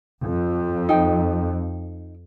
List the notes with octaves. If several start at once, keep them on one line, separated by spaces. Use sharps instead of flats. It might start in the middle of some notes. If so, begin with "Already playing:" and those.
F2
D#4 G5